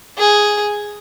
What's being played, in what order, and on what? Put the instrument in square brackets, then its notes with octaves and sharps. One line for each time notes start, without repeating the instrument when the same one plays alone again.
[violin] G#4